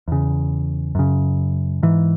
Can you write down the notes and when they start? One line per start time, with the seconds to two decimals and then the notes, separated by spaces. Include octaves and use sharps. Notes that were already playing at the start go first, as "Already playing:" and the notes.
0.08 E2 C#3
0.95 F#2 C#3
1.83 G#2 E3